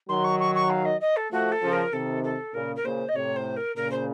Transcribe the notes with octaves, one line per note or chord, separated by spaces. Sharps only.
D#3 F#3 C6
C#6
C#6
C#6
F5
D#5
D#5
A4
F3 A3 F#4
A4
C#3 F3
A#4
C3 D#3 A4
A4
A#2 C#3 A#4
A#4
A#2 C#3 C5
D#5
A2 C3 C#5
C5
A#4
A#2 C#3 A#4
C5